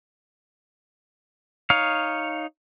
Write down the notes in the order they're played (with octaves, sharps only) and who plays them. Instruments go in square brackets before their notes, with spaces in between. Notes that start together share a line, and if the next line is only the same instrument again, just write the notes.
[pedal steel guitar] D#4 C#5 F5